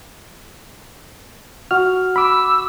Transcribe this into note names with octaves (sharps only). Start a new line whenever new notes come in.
F#4 F6
B5 D6 E6